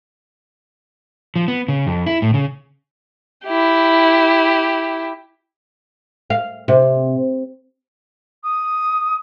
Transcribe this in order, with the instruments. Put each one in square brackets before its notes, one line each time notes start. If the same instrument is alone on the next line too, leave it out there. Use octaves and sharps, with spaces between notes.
[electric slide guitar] F3
B3
C#3
F2
E4
A2
C#3
[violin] E4 G4
[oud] F5
C3
[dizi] D#6